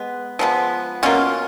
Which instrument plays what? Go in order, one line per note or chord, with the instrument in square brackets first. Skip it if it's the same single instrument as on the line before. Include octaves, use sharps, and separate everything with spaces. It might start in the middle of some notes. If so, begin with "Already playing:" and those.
Already playing: [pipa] G#3 B3
F3 G#3 B3
B2 A#3 C#4 F4